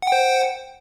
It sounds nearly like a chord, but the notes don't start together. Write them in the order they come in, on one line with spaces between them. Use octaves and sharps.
F#5 G5 C5